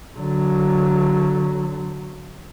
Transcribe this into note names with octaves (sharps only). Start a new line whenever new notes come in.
D3 F#3